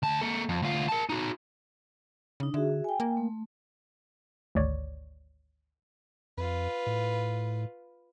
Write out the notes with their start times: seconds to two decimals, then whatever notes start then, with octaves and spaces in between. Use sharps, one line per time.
0.03 D2 A5
0.21 A#3 A4
0.49 F2
0.62 D2 F4
0.88 A#4 A5
1.09 D#4 F#4
2.40 C#3 D4 D#4
2.54 D3 F#4 G#4 E5
2.84 G5 G#5
3.00 A#3
3.17 A3
4.55 G#1 D2 C#5 D5
6.37 F2 F4 B4
6.86 A2